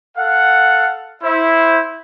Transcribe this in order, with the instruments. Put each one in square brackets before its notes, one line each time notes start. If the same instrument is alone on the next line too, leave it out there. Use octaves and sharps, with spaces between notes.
[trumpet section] A4 F5 F#5
E4 C5